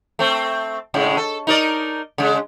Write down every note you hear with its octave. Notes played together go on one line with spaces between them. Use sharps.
A3 C4
A2 C#3 G#3
A4
D#4 A#4 D5
C#3 G#3